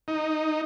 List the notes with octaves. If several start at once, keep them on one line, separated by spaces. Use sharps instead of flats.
D#4